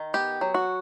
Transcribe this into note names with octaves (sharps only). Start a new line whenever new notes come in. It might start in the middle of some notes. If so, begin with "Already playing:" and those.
Already playing: D#3
B3 G4
F#3
F#4